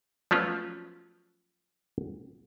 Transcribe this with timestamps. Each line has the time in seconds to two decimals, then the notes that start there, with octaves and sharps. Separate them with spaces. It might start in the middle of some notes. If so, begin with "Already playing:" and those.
0.31 F3 F#3 A3 B3 C#4 F4